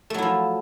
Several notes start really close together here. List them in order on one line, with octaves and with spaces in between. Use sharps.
A3 F#3 E4 F3